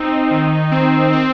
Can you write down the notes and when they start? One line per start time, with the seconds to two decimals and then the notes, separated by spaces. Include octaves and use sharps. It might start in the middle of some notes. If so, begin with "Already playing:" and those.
Already playing: C4 D#4
0.31 D#3
0.72 C4
1.13 C4